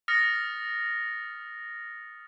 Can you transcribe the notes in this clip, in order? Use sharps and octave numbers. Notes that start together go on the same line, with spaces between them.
D#6 F6 A6 A#6 C#7